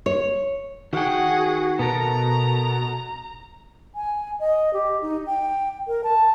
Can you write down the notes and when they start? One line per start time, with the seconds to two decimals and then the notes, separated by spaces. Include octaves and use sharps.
0.06 C#5
0.93 D#3 F#4 G#4 F#5 G5
1.79 B2 B3 A4 A#4 A#5
3.95 G#5
4.40 D#5
4.73 G4
5.02 D#4
5.27 G5
5.88 A#4
6.04 A5